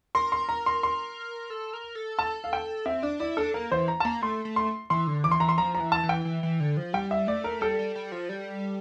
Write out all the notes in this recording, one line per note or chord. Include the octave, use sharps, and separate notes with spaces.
A#4 C6
C6
A#5
C6
C6
A4
A#4
A4
A5
F5
G5
C4 E5
D4 D5
E4 D5
D4 A4
A#3 A#4
E3 C5
A#5
A5
A#3 A#5
A3 C6
A3
C6
E3 C6
D3
E3 D6
C6
E3 A#5
C6
F3 A#5
A#5
E3
A5
E3
G5
E3
E3
D3
F3
G3 G5
E5
A3 D5
A#4
G3 A4
G3
G3
F3
G3